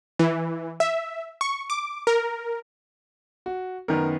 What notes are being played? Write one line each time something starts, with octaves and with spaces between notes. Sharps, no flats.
E3
E5
C#6
D6
A#4
F#4
F#2 D#3 B3 A#4